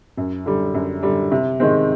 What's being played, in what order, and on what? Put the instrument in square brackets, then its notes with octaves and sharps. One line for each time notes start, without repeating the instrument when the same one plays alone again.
[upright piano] F#2
D3 G3
F#2
D3 G3
C3
D#3 G#3 C4